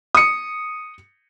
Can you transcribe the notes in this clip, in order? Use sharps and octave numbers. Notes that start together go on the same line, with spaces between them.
D#6 C#7